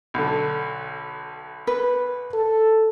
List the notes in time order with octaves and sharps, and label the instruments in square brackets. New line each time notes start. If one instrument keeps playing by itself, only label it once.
[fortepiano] B1 D3
[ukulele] B4
[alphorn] A4